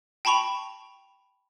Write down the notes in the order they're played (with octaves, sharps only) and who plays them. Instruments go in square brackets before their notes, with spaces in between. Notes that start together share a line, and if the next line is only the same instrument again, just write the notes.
[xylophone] G5 A5 B5 C#6 F7